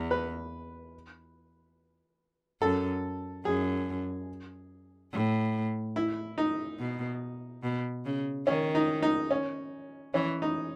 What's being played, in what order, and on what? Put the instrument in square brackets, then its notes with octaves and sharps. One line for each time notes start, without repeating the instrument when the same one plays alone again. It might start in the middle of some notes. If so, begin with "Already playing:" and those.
Already playing: [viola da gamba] E2
[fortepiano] B4
[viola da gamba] F#2 [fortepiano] A4
[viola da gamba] F#2 [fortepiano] G#4
[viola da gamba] A2
[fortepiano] E4
D#4
[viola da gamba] B2
B2
C#3
[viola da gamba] D#3 [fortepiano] C#4
[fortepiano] D#4
D#4
C#4
[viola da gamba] E3 [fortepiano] C#4
[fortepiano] D#4